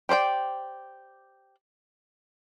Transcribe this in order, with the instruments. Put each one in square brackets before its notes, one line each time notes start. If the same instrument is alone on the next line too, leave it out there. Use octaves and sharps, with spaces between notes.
[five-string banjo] G4 C5 D5 G5